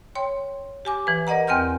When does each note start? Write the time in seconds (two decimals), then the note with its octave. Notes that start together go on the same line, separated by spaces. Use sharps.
0.15 C#5 G5 C6
0.85 G4 G#5 D6
1.07 E3 B4
1.27 A#4 D5 D#5 F#5 A#5
1.47 E2 C4 G5 C6 F6 G6